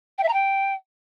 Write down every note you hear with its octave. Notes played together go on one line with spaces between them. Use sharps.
G5
E5
A#5
G5